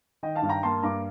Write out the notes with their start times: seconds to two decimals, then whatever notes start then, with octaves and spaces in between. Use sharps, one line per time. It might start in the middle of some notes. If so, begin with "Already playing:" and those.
0.23 D#3 D#5 G5
0.35 F5 A5
0.42 G2
0.49 G5 A#5
0.63 A#3 A5 C6
0.83 G2 A#5 D6